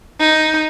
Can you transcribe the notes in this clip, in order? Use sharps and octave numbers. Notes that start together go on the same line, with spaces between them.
D#4